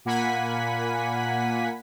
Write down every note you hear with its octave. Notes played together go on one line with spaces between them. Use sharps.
A#2 A#3 F#5 G#5 B5 B6